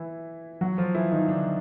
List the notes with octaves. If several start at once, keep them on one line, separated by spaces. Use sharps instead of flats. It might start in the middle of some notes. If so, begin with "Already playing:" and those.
Already playing: E3 E4
F#3 F#4
F3 F4
E3 E4
D#3 D#4
D3 D4